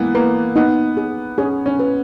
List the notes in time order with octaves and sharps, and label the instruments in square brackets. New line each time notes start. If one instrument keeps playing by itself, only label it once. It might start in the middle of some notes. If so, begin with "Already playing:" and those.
Already playing: [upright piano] E3 A#3 B3 [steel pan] G#3
[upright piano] A#3 [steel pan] B4
[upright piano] B3 [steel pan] D#4
[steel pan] G#4
[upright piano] C#4 [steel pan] G#4
[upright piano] C#4
[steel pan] B4